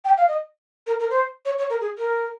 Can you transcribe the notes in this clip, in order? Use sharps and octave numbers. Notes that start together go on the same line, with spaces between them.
G5
F5
D#5
A#4
A#4
C5
C#5
C#5
A#4
G#4
A#4